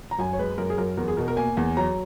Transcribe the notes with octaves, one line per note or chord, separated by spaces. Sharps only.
A#5
F#2 G#5
C#5
G#3 B4
F#2 A#4
G#4
F#2 A#4
E2 A#4
G#4
B2 A#4
A#4
A#3 G#5
E2 G#5
F#3 A#5